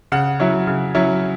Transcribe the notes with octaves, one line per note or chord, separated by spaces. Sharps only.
C#3 F#5
F#3 C#4 E4
C#3
F#3 C#4 E4